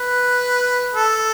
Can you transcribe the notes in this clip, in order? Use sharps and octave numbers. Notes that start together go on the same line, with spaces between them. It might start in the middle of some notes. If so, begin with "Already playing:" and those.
Already playing: B4
A4